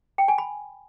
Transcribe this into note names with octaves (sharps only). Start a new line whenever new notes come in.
G5
G#5
B5